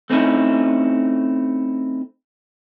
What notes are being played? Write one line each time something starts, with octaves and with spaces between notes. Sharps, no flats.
A3 C4 C#4 D#4 E4